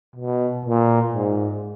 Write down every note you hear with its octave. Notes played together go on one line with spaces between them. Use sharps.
B2
A#2
G#2